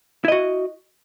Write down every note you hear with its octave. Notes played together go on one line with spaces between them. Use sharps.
E4 F#4 D#5